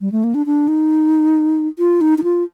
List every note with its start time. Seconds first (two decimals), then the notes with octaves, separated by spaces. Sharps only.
0.01 G3
0.12 A3
0.24 A#3
0.34 D4
0.46 D4
0.68 D#4
1.79 F4
2.01 D#4
2.18 D#4
2.24 F4